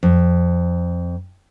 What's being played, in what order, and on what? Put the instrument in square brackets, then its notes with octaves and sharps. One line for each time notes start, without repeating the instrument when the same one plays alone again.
[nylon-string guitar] F2